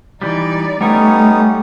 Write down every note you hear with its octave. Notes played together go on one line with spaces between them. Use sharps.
E3 G3 D#4 D5
G3 A3 B3 C#4 D#4 C#5